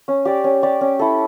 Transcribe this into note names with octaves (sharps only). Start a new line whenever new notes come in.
C#4
G4 D5
C#4
G4 D5
C#4
E4 A4